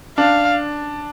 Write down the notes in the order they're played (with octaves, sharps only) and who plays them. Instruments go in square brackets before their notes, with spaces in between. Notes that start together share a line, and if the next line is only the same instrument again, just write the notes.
[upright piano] D4 [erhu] F5